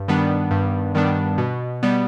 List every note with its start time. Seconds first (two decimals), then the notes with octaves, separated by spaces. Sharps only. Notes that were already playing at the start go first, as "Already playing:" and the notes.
Already playing: G2
0.08 D#3 G3 B3 D4
0.51 G2
0.95 D#3 G3 B3 D4
1.38 B2
1.83 G3 B3